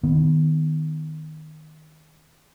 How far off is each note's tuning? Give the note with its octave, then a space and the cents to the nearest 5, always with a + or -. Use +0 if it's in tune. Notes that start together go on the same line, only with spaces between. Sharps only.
D#3 +0 B3 +0